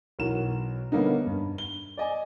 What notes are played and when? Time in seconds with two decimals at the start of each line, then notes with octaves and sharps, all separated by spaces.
0.19 B1 E3 F#4 A#4 E7
0.92 D3 G3 A#3 B3 C#4 D#4
1.27 G2
1.58 G7
1.97 D5 D#5 G#5